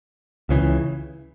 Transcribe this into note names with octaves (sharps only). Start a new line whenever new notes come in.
C#2 C#3 E3